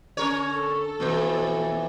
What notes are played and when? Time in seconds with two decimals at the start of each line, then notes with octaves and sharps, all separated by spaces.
0.17 D3 C#4 A#4 C#5
0.50 A4
1.00 F2 B2 E3 A#3